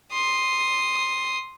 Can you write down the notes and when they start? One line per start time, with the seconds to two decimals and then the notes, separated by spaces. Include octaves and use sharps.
0.12 C6 D#6